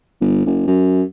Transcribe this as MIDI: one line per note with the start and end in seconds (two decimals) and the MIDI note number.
0.21 0.45 31
0.46 0.62 30
0.67 1.03 42